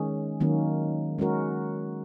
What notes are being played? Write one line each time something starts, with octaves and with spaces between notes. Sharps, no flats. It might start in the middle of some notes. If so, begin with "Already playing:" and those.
Already playing: D#3 G#3 C#4 G#4
D#3 F#3 A#3 C#4
G#3 C#4 F#4 A#4